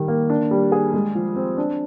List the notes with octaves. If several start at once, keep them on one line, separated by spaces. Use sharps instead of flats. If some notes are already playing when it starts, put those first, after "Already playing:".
Already playing: D#3 G3
A#3
D4
G3
G#4
G#3
F3
C4
D4